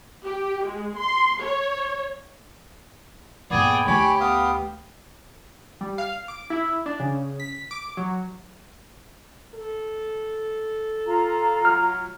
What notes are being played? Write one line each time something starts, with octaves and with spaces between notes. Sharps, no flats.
G4
G#3
C6
C#5
G2 A#2 B3 G#4 D5 G5
D2 D3 G4 C#5 G#5 B5
B3 F5 D#6
G3
F5
D6
E4
D4
C#3
B6
D6
F#3
A4
F4 A#5
F#3 F6